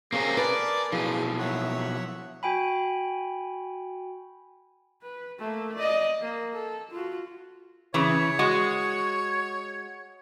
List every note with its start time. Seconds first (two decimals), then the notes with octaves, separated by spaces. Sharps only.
0.12 C3 A#3 C4 C#4 G#4 C#6
0.37 A#4 B4 D5 G#5 A5
0.92 B1 F3 E4 G#4
1.39 C#5 E5 F#5
2.43 F#4 G5 G#5 B5
5.02 B4
5.39 A3 A#3
5.75 D5 D#5
6.21 A#3
6.53 A4
6.91 F4 F#4
7.94 C#3 E3 C#5
8.39 G#3 F#4